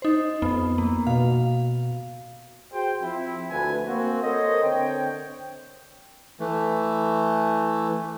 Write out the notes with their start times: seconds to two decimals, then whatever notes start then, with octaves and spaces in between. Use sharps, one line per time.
0.02 D#4 C5
0.42 F2 B3
0.78 A#3
1.07 B2 F5
2.73 F#4 G#4 C5 G5
3.02 F3 C4 E4
3.50 D2 B4 G#5
3.86 A#3 C4 F#4
4.23 A4 A#4 C5 C#5 D#5
4.64 D3 C4 C#5 G5
6.40 E3 A3